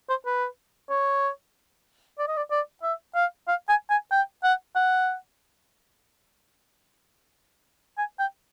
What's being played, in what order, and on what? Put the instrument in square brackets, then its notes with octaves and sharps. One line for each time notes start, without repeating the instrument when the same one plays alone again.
[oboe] C5
B4
C#5
D5
D#5
D5
D5
E5
F5
F5
G#5
G#5
G5
F#5
F#5
G#5
G5